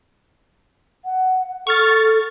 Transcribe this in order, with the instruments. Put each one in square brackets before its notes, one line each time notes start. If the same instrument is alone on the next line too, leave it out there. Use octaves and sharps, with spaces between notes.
[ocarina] F#5
[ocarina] A4 [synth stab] C#6 F6 A6